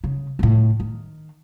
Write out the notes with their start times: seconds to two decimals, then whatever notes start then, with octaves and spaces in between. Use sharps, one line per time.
0.04 C#3
0.39 F2 A2
0.80 D#3